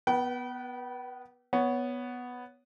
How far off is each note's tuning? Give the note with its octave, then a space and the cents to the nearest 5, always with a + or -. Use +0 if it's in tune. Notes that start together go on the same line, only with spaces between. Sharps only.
B3 +0 B4 -25 G5 -45
B3 +0 C#5 +10